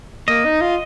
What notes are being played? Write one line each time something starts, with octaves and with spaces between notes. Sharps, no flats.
A#3 D#5
D#4
F4